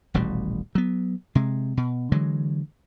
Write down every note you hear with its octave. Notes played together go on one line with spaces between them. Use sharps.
D#1 A1 B2 G3
F#3 B3
C3 G#3
B2
D3 E3 F#3 G#3